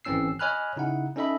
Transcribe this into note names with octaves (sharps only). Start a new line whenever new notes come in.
G#1 E3 C4 C#4 E6 C7
C#5 D#5 G#5 B5 F6 F#6
C#3 D#4 E4 F#5
C#4 D#4 A4 D#5 E5 B5